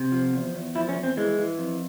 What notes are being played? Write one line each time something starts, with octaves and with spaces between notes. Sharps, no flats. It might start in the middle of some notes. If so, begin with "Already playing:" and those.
Already playing: C3
F3
E2
E2
F3 E4
C#4
E2
C4
E3 G#3
E3
F2